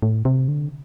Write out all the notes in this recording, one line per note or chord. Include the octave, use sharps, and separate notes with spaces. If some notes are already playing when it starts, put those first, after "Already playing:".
A2
C3
D3